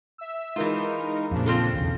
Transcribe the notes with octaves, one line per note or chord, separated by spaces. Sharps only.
E5 E6
E3 G#3 D#4 F4 A#4
F2 A#2 C#3 F3 D4
C4 F4 A4
B1 E2 C#3